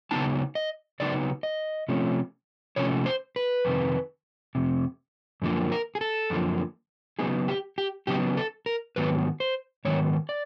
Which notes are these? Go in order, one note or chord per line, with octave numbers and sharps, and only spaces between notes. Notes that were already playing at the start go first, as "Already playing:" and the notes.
C#3 F#3 B3 D#4 A5
D#5
C#3 F#3 B3 D#4 D5
D#5
C3 F3 A3 C#4
C3 F3 A3 C#4 C#5
C5
B4
F2 C3 D#3
F2 C3
F#2 D3 F3 A#3
A#4
G#4
A4
F#2 D3 F3 A#3
C#3 F#3 B3 D#4 G#4
G4
G4
C#3 F#3 B3 D#4 G4
A4
A#4
G#2 D#3 F#3 B3 B4
C5
G#2 D#3 F#3 B3 C#5
D5